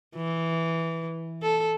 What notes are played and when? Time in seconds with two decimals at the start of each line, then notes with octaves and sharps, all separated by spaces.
0.16 E3
1.42 A4